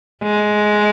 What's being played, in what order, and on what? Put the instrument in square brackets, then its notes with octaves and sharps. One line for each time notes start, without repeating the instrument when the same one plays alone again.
[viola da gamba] G#3